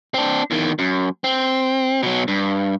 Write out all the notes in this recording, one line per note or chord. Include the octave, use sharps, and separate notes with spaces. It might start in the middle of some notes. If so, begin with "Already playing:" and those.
C4 D4
E2 D#3
F#2
C4
B2 F#3
G2